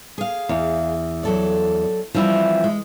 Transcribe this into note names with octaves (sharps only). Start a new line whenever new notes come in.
G#4 F5
E2
F#3 A4 D5
E3 F3 G3 C4 E4
G#3